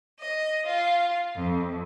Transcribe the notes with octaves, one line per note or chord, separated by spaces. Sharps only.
D#5
F4
F2